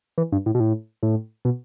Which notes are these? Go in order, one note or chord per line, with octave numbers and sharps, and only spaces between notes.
E3
G2
A2
B2
A2
A2
B2